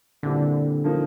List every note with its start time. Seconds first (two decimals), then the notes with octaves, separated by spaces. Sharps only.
0.23 A#2 D3 G3 C4 E4 G4
0.84 F3 A#3 D#4